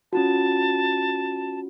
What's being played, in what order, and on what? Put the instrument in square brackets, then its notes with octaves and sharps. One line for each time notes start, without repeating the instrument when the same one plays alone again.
[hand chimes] C#4 F4 F#4 [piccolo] A5